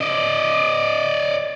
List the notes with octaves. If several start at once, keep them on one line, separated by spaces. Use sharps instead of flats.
D5 D#5